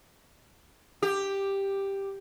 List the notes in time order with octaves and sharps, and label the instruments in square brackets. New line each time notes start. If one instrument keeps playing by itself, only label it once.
[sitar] G4